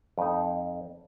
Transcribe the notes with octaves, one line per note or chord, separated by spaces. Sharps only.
F2 D#4